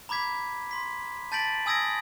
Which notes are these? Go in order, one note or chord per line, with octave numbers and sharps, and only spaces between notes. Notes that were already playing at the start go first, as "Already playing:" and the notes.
A#5 B5 D6 G#6 B6
C6 B6
A5 G6 A6 B6 D7 F#7
G#5 D#6 E6 G#6 A#6 D7